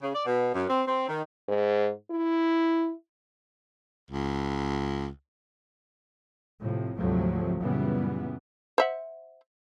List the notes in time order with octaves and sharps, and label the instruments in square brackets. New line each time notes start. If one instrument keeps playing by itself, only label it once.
[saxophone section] C#3
D5
B2
F#2
C4
C4
D#3
[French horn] G#2
E4
[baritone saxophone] C#2
[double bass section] A2 C3 F3
D2 G#2 C3 F3 F#3 A3
F#2 A#2 C#3 E3 G3 B3
[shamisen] C5 E5 F#5